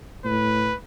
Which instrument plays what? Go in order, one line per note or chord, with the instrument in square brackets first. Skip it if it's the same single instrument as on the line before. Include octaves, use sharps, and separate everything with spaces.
[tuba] A2 [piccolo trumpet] B4